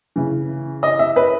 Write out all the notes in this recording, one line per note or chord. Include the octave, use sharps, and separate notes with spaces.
C#3 E3
D#5
E5
B4